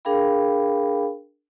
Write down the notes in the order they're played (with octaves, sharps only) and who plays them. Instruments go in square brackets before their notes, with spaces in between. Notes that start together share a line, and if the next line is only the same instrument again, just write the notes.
[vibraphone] D4 G#4 A#4 F5 G5 B5